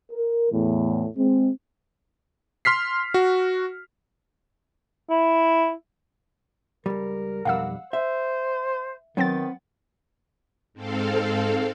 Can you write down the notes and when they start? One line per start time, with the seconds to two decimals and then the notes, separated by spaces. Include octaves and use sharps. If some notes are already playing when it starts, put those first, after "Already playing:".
0.12 A#4
0.51 E2 A2
1.17 G#3 C4
2.65 C6 F6 B6 C7
3.14 F#4
5.10 E4
6.86 C#2 G3 A#4
7.45 B1 F2 G3 F5 F#5 E6
7.93 C5 E5
9.17 D#3 F#3 B3 C4 G5 A6
10.73 G#2 C4 A4 F5